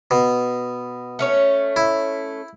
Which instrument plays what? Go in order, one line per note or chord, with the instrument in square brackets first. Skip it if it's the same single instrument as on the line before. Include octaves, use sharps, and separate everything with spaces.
[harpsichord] B2
[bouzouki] A3 C#4 C#5
[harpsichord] E4